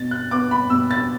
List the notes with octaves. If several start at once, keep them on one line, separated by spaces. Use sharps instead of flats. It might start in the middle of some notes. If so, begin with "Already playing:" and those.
Already playing: B2 A6
F#6
B3 D6
B5
B2 E6
A6